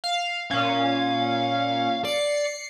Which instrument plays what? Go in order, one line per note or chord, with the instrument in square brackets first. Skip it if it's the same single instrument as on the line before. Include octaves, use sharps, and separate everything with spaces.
[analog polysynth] F5
[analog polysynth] A#2 C#4 [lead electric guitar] F5
[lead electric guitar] D5 [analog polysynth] C7 C#7